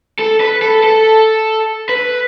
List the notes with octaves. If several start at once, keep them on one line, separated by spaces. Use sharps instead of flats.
A4
B4
A4
A4
B4